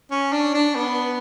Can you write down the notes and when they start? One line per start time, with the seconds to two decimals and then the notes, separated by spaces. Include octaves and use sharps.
0.11 C#4
0.32 D4
0.54 D4
0.75 B3